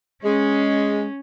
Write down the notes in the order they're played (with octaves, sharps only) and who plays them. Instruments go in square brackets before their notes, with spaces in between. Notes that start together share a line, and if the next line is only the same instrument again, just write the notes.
[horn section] G#3 [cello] C#4